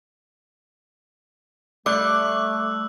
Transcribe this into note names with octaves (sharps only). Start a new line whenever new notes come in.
G3 A3 D5 D6 E6 F#6